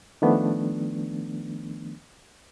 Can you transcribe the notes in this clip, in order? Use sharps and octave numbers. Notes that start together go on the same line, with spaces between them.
D#3 F3 A3 B3 D4